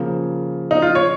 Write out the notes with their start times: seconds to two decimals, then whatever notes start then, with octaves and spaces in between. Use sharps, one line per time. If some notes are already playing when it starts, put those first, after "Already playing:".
Already playing: C#3 F3 A#3
0.71 D#4
0.82 F4
0.95 C#5